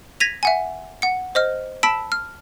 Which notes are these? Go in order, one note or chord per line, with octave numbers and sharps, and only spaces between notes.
G#6 A#6 B6 D#7 F7
E5 F#5 G#5
F#5 C#7
C5 D#5 F6
A5 B5 E6 B6 D7 E7
F6